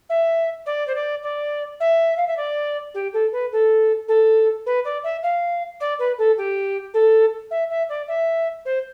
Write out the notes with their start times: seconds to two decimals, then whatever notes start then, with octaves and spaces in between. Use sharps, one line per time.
0.09 E5
0.65 D5
0.87 C5
0.95 D5
1.22 D5
1.80 E5
2.16 F5
2.27 E5
2.36 D5
2.94 G4
3.13 A4
3.32 B4
3.52 A4
4.08 A4
4.66 B4
4.84 D5
5.03 E5
5.22 F5
5.80 D5
5.99 B4
6.18 A4
6.37 G4
6.93 A4
7.50 E5
7.69 E5
7.88 D5
8.07 E5
8.65 C5